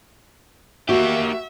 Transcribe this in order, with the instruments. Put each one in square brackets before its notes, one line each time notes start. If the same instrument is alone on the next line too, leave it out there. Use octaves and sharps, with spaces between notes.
[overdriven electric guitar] A#3 G4 [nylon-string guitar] F#4 [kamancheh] E5